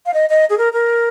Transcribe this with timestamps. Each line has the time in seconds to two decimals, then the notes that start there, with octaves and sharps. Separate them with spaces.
0.06 F5
0.14 D#5
0.30 D#5
0.50 G#4
0.58 A#4
0.73 A#4